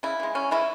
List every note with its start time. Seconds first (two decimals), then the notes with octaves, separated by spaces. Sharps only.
0.03 C#3 E4
0.20 E3 G#3
0.35 C#3 C#4
0.51 E3 G#3 E4